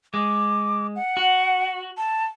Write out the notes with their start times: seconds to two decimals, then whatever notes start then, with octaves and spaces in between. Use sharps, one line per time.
0.14 G#3 D6
0.96 F#5
1.17 F#4
1.97 A5